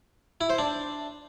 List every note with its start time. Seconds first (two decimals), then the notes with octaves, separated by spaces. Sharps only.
0.41 E4
0.50 C5
0.58 D4